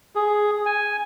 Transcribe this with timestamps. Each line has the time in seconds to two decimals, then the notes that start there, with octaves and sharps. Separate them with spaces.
0.15 G#4
0.66 G#5